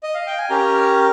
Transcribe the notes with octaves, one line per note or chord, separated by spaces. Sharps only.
D#5
F5
G5
G#5
C#4 G4 A#4 A#5